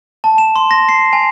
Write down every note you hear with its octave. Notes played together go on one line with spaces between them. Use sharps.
A5
E7
C6
A#6
C7
G#5